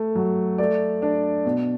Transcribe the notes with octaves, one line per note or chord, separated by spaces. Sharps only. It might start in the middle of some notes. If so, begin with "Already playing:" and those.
Already playing: A3
F#3
A3 D5
D4
B2